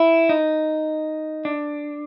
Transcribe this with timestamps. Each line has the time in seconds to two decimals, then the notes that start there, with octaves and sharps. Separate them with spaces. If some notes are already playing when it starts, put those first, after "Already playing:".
Already playing: E4
0.29 D#4
1.45 D4